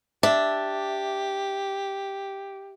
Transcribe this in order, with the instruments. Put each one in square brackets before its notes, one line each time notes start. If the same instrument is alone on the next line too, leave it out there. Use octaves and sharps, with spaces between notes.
[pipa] D4 [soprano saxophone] G4 [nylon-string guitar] E5